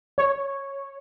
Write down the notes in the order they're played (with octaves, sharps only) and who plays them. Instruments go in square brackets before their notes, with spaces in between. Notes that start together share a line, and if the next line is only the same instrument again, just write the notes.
[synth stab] C#5